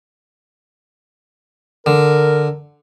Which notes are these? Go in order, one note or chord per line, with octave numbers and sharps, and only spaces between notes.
D3 A#4